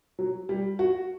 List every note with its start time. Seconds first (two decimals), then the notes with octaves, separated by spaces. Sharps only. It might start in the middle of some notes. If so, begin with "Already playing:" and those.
0.19 F#3
0.49 G3
0.79 F#4